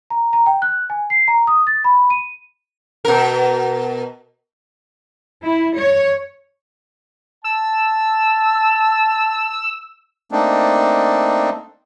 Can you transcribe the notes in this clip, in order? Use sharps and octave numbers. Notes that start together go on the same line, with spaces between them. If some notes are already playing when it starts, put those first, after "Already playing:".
A#5
A#5
G5
F#6
G#5
C7
A#5
D#6
A6
B5
D#7
B2 A#4
E4
C#5
A5 E6
A3 A#3 C4 D4 D#4